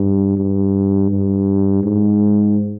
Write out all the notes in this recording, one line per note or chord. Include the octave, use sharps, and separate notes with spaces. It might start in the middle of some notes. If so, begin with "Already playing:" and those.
Already playing: G2
G2
G2
G#2